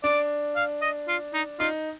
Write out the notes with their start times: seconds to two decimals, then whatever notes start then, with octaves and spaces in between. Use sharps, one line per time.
0.04 D4 D5
0.56 F5
0.82 D#5
1.08 F4
1.34 D#4
1.60 D#4 F4